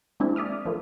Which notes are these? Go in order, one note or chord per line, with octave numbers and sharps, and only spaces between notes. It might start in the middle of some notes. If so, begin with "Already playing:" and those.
G#3 A#3 C4 D4 E4
D5 E5 D#6 F6
F3 A3 A#3 F4